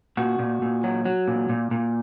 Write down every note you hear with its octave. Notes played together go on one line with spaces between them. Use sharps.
A#2 F#4
A#2
A#2
F#3
F#3
A#2
A#2
A#2